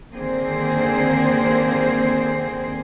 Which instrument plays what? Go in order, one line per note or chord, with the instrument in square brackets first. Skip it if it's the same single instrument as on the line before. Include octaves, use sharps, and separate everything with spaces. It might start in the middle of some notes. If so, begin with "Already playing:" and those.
[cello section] D3 D#3 A#3 C4 G#4 C5